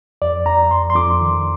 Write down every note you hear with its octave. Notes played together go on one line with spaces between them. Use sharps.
F2 D5
F2 A#5
F2 C6
C6
F2 D6
D#3